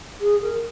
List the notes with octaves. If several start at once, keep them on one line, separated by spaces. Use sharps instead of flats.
G#4
A#4